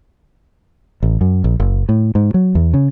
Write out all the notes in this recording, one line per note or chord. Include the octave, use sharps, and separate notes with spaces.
A1
F#2
A#1
F#1
A2
G#2
F#3
E2
C#3